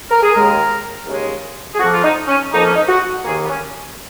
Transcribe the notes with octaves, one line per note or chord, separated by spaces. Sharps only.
A#4
G#4
D#2 C#3 G#3 A#4
D#2 C#3 G#3
G#4
F2 F3 A#3 F#4
F4
D#4
C#4
F2 F3 A#3 D#4
C#4
D#4
F#4
D#2 D#3 A#3 G#4
B3
C#4